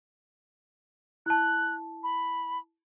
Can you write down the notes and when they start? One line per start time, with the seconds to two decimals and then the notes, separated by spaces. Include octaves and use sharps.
1.26 E4 A5 F#6
2.03 B5